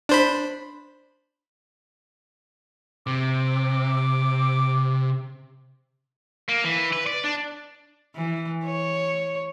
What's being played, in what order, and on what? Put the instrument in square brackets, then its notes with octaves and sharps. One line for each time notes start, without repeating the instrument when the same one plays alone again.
[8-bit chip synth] D4 C5 B5
[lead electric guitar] C3 [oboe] D6
[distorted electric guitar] A#3
E3
B4
D5
D4
[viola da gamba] E3
C#5